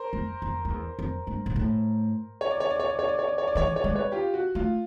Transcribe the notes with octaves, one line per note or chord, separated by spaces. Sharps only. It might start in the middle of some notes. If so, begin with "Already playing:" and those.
Already playing: A#4 C5
F2
F2
F2
E2
F2
G2
A#2
A2
C#5
D5
C#5
D5
C#5
D5
C#5
D5
C#5
D5
C#5
D5
E3 C#5
D5
C#5
G#3 D5
B4 C#5
F4 G4
F#4
A3 F4